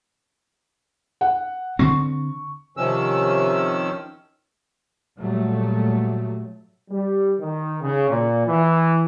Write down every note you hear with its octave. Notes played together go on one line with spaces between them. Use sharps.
F#5
D3 C4 C#6
C3 D#3 F3 C#4 E6
A#2 F#3 G3 A3
G3
D#3
C#3
A#2
E3